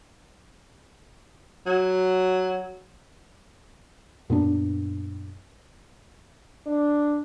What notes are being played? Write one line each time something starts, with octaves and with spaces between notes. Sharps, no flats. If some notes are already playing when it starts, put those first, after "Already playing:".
F#3
F#2 A#2 B3 D4
D4